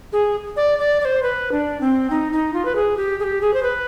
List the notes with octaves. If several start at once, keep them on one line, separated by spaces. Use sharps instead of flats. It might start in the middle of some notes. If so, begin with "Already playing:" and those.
G#4
D5
D5
D5
C5
B4
D4
C4
D#4
D#4
F4
B4
G#4
G4
G#4
G4
G#4
C5
B4